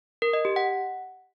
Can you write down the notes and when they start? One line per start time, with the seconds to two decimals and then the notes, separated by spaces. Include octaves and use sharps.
0.22 A#4
0.33 D#5
0.45 G4
0.56 F#5